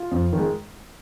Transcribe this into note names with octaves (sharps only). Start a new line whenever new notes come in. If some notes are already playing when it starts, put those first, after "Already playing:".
Already playing: F4
F2
D#3 G#3